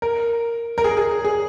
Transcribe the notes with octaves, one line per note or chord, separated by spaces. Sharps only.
A#4
A#4
G#4
G#4
G#4